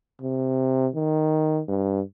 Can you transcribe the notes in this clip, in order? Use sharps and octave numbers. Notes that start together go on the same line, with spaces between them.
C3
D#3
G2